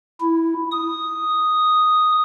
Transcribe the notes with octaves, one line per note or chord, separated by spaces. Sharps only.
E4
D#6